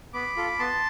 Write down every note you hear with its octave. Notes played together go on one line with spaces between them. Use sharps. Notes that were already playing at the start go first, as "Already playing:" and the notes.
B3 B5 D6
F4 A4
B3 A5 C6